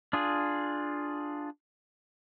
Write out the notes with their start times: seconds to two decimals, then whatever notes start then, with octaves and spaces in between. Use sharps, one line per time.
0.13 D4 F4 G#4